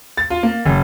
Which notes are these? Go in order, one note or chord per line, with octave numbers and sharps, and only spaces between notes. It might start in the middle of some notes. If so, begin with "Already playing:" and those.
A6
F4
A#3
F#1